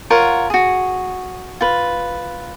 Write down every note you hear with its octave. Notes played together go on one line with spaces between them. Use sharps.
F4 A#4 C#5 F#5
F#4 G#4
F4 B4